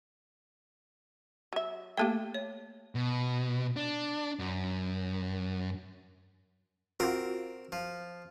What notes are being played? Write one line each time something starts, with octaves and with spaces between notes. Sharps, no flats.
F#3 E5
A3 A#3 G4 A4 E5 G5
C#5
B2
D4
F#2
C4 F4 F#4 A#4
F3